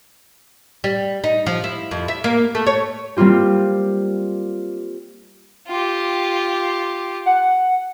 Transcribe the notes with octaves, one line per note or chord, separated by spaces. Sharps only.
G3
D#4
F3
E4
F2
E5
A#3
A3
C#5
G3 A#3 C4 F4 G4
F4 G4
F#5